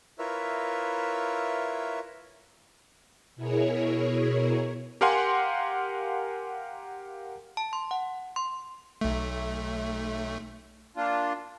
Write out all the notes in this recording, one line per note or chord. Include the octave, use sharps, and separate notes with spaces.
E4 F4 A#4 B4 C#5 E5
B2 E4 G#4 A#4 C#5
G4 A#4 F5 F#5 G#5 C6
A5
C6
F#5
C6
B1 A3
A#3 D4 F4